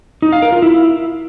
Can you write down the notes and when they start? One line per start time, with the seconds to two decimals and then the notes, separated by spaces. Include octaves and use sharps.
0.22 D#4
0.32 F5
0.42 A#4
0.52 F4
0.62 E4